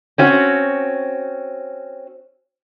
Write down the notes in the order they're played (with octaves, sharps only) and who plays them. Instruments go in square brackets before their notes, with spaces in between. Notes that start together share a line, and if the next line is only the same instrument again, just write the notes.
[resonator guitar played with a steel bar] C4 C#4 F#4